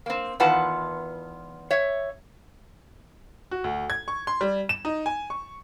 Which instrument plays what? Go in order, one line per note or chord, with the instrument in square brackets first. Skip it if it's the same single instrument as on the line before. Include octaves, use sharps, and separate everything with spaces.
[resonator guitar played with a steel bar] A#3 C4
E2 D#3 F4 B4 F#5 A5
C#5 E5
[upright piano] F#4
D2
G#6
C#6
C6
G3
E7
D#4
G#5
C#6